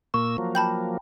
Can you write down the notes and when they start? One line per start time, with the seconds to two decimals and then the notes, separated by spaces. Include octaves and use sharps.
0.14 A#2 A#3 C#6 E6
0.38 F3 F#3 A#3
0.55 G5 A5 B5 G6